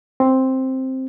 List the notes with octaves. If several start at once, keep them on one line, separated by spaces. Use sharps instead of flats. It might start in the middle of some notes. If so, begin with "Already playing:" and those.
C4